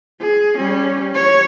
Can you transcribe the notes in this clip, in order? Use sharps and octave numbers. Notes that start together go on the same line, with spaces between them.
G#4
G3 C#4
C#5